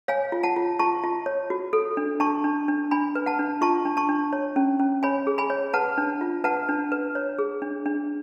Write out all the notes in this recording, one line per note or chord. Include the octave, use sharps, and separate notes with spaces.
C#5 F5 G#5
F4
F#5 A5
F4
F4 A5 C#6
F4
C#5
F#4
A4
D4
D4 A5 C#6
D4
D4
D4 G#5 B5
B4
F#5 A5
D4
F4 A5 C#6
D4
A5 C#6
D4
C#5
C#4
C#4
C#5 G#5 B5
G#4
G#5 B5
C#5
B4 F#5 A5
D4
F4
B4 F#5 A5
D4
B4
C#5
G#4
D4
D4